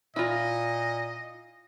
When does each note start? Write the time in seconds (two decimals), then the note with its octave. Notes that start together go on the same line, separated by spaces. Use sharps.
0.16 A#2 E4 F4 D#5